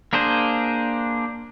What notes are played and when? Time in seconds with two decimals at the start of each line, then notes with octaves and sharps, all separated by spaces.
0.13 A#3 D4 G#4 C5